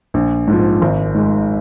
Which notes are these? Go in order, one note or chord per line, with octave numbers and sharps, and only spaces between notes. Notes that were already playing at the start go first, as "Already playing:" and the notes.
A#1
G#2 F3
G#1
G#2 G#3